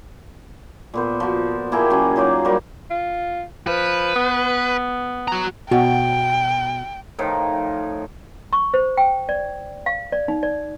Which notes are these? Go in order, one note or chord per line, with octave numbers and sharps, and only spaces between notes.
A#2 B3 C5
F3 F#4
A#3 E4 G#4 G5
F#3 C#4
F#3 D#4 F4 D5
G3 A#3 F#4
F4
F3 B4
B3
F#4 A#5
B2 F#4 G5
A2 D#3 F3
C#6
C5
G5
D5
F5
D5
D#4
D5